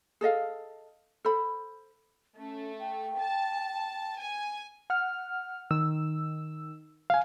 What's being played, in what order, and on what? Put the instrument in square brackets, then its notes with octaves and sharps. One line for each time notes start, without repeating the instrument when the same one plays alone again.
[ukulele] G#4 A4 D#5 F5
A4 C5 B5
[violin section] A3 [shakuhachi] C#4
[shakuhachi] G5
[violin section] A5
G#5
[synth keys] F#5 F6
D#3 E6
[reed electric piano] F5 G#5